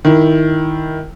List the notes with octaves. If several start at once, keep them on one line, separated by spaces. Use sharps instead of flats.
D#3 E4